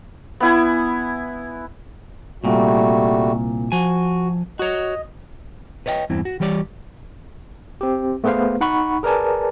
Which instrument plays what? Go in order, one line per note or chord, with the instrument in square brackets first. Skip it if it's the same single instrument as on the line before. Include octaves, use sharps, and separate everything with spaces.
[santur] B3 E4 G#5
[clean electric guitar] C2 A#2 [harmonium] G3 A3 F#4
[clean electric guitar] F3 G#5 [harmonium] F#4
[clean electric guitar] F#4 C#5 [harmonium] D#5
[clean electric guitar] B4 C#5 D#5 F5 G5
E2 G2 C4 E4
F#4
E3 G3 G4 C#5 D5
[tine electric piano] C4 G4
A3 B3 G#4 B4 C5 F5
D#4 F#5 B5 C#6
G#4 A#4 B4 D5 G#5 A5